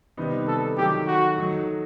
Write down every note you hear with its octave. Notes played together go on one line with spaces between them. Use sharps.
C3 D#3 G3 B3 D#4
A4
D#3 F#3 A3 G4
F#4
D#3 F#3 A3 D#4